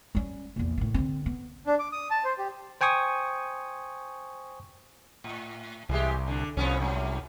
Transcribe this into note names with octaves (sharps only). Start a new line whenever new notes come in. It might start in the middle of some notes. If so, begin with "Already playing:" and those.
G3 C#4
A#1 E2
A2 D#3
D3 C4
B3
D4
D6
D#6
A5
C5
G4
C5 G5 G#5 C#6 D#6
A2
C2 E3 G#3 G4
D3 D4
C2 F3 B3 C#4
G#2 C3 F#3